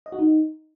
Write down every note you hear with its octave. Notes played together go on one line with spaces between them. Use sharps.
D#5
F#4
D#4